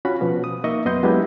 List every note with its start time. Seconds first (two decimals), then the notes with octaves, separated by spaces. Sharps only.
0.05 C#4 F4 F#4 B5
0.21 B2 F3 B3
0.44 D#6
0.64 A#3 D#4 D#5 E5 C#6
0.85 F#2 B3 D#5 C6 G6
1.03 F#3 G#3 B3 D4 E4 G4